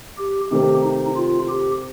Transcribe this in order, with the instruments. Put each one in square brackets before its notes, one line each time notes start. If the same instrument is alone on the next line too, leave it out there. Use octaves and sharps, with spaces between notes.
[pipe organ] G4
[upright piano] C3 D#3 A3 C4 [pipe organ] G4
[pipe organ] D#4
F4
G4